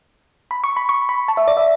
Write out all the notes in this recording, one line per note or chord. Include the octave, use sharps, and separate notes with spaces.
B5
C#6
B5
C#6
B5
A5
E5
D5
E5